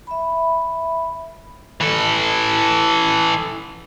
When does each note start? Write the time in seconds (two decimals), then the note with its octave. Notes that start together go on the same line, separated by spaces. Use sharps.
0.07 E5 B5
1.81 E3 A4